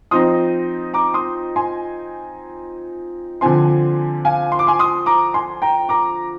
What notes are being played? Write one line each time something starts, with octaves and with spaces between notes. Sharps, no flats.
F3 C4 D#4 C6 D#6
A#5 D6
C6 D#6
G#5 C6
D3 F3 C4 G#5 C6
F5 G#5
C6
D6
G#5 C6
C6 D#6
A#5 D6
G#5 C6
G5 A#5
A#5 D6